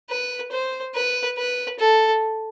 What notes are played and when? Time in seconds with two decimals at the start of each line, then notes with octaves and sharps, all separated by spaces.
0.10 B4
0.51 C5
0.95 B4
1.38 B4
1.80 A4